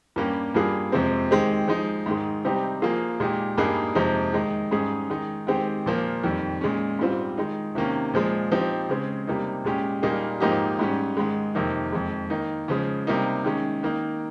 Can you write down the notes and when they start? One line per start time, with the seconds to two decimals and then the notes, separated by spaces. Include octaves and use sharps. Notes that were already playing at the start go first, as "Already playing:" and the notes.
0.16 G2 G3 A#3 C#4 G4
0.54 G2 G3 A#3 F4 G#4
0.92 F2 C3 F3 G#3 C4
1.31 D#3 G#3 C4 G4
1.68 F3 G#3 D#4
2.06 G#2 D#3 G#3
2.44 C3 G3 C4 D#4 G4
2.82 F3 A#3 F4 G#4
3.20 A#2 G#3 D#4 G4
3.58 G2 G3 A#3 D#4 G#4
3.95 F2 C3 F3 G#3 D#4
4.33 D#3 G#3 D#4
4.71 G#2 G3 C#4 G#4
5.10 D#3 G#3 D#4
5.47 D#3 G#3 C4 G4
5.86 A#2 F3 A#3
6.23 F2 D#3 G3
6.61 A#2 G#3 C#4
6.99 G#2 G3 C4 F4
7.38 D#3 G#3 D#4
7.75 C3 D#3 A#3 C#4
8.14 A#2 F3 G#3
8.52 F3 C4 D#4 G4
8.89 C#3 G#3 C4
9.27 C3 G3 A#3 D#4
9.64 A#2 G#3 C#4 G4
10.03 A#2 G3 A#3 D#4 G#4
10.40 G#2 F3 A#3 D#4 G4
10.79 G#2 G3 C#4
11.17 G#2 D#3 G#3
11.55 F2 C3 D#3 A#3 D#4
11.92 F2 D#3 G#3
12.30 D#3 A#3 D#4
12.68 C#3 F3 G#3
13.07 C3 G3 A#3 D#4
13.44 D#3 G#3 C#4
13.83 D#3 A#3 D#4